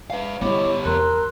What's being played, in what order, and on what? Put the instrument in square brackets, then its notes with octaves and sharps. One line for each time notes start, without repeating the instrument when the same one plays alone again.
[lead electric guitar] B4 F5 [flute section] E5
[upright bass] G3 [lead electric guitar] B3 G4 [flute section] E4 D#5 D6 [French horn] C#5
[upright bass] E2 [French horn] A#4 [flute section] C6 E6 F#6